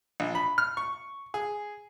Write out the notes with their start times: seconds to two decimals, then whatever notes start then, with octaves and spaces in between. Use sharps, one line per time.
0.20 A#1
0.35 B5
0.58 F6
0.77 C#6
1.34 G#4